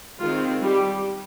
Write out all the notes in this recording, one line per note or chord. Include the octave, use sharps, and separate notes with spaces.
D#3 G#3 C4 F4
G3 G4